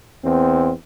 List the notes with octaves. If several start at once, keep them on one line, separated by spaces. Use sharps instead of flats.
E2 C4